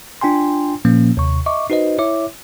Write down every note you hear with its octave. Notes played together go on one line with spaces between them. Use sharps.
D4 F4 G5 G#5 C6
A#2 F3 A#3 C#4
D#2 C3 C#6
D#5 E5 C#6 D6
D#4 F#4 B4 C5 D#5
E4 C#5 E5 D6